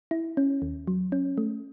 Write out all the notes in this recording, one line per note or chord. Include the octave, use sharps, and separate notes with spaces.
E4
C#4
D#2
F#3
C#4
A3